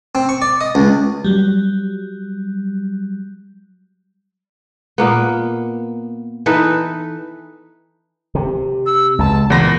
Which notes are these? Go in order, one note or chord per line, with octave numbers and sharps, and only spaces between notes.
C4
C#6
D5
D#5
C#2
F#3 G3
A#2 A#3 B3
E3 D#4 A4 B4
C3
E6
C#2 A5
E2 A#2 C5 A#6